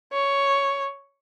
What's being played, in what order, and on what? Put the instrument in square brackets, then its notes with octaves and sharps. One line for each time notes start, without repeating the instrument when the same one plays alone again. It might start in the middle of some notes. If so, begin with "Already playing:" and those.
[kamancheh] C#5